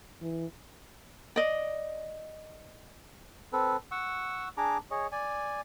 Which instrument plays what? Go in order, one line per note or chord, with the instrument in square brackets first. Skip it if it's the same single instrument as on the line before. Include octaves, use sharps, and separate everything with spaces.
[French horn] E3
[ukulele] D5 D#5
[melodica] C4 A4 B4
F#5 C#6 E6
D4 G#4 A#5 D6
G#4 C#5 D#5
D5 G#5